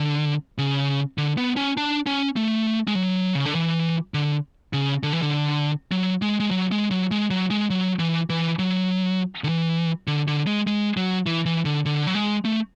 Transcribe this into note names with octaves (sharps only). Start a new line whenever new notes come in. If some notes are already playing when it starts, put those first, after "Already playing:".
Already playing: D3
C#3
D3
B3
C#4
D4
C#4
A3
G#3
F#3
C#3
D3
E3
D3
C#3
D3
E3
D3
F#3
G#3
G#3
F#3
G#3
F#3
G#3
F#3
G#3
F#3
E3
E3
F#3
D3
E3
D3
D3
G#3
G#3
F#3
E3
E3
D3
D3
F#3
G#3
A3